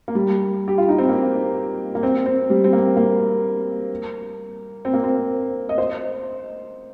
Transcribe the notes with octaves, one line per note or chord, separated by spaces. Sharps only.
A#3
G3
G4
F4
D#4
C4
A#3
A#3
C4
C4
G3
C4
A#3
A#3
C4
A#3
C4
D#5
C5